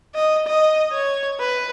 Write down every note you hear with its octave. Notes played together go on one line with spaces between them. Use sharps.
D#5
D#5
C#5
B4